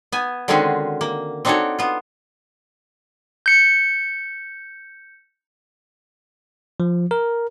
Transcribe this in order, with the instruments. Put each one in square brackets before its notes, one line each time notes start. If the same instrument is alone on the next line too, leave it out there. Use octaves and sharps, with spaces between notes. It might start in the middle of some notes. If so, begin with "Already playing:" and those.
[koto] B3 G#5
D3 D#3 G#3 C4 C#4 F#4
A#3
C4 D4 D#4 F#4 A4 C#5
B3 F4
[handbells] G6 C#7
[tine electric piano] F3
A#4